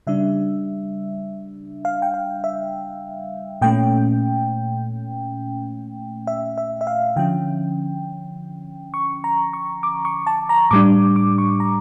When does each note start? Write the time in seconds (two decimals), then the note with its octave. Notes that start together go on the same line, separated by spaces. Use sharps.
0.07 C#3 G3 D4 E5
1.85 F5
2.02 G5
2.14 F5
2.44 E5
3.62 A#2 A3 C#4 G5
6.27 E5
6.58 E5
6.81 E5
6.87 F5
7.16 D3 F3 C#4 G5
8.94 C#6
9.24 A#5
9.53 C#6
9.83 D6
10.05 C#6
10.27 A5
10.49 A#5
10.71 A2 G3 D4 D6
11.16 D6
11.38 C#6
11.60 A#5